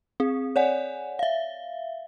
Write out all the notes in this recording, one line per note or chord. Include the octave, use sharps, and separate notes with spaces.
C4 G#4
C#5 D5 F#5 G#5
E5 F5